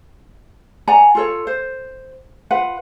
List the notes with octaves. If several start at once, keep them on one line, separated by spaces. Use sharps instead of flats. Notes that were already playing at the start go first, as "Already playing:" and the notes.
D5 F#5 G#5 A#5
F4 A4 C#5
C5
F4 B4 F#5